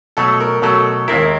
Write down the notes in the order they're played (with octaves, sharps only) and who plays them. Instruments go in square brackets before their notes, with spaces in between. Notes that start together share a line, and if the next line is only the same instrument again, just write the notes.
[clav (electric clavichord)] B2 F#3 A3 [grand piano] A4
[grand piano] A#4
[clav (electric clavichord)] B2 F#3 A3 [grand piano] A4
[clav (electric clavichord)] D#2 D#3 G#3 C4 E4 [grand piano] A#4